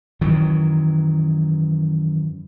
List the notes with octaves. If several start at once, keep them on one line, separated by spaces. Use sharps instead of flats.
F#2 D#3 E3 F#3